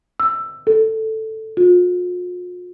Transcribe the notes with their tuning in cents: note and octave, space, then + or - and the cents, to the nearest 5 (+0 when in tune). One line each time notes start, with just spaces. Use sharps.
E6 +15
A4 +0
F4 +40